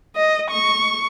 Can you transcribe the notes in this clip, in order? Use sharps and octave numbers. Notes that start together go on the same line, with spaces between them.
D#5
C#6